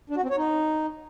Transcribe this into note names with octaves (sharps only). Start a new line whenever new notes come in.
D4
F#4
C4
C#5
D#4